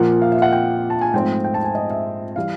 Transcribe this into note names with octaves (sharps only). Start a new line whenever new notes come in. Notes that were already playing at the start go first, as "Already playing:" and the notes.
Already playing: A#2 F3 A#3 F#5
F5
E5
F5
F#5
G5
A5
G#5
G#2 F3 A3 C4 F4 G5
G5
A5
G#5
D#5
E5
E3 G3 F5